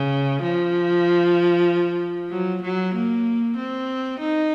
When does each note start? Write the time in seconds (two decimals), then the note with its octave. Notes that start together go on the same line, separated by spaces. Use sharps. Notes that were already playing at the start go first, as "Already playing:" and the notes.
Already playing: C#3
0.43 F3
2.31 F#3
2.62 F#3
2.94 A#3
3.57 C4
4.19 D#4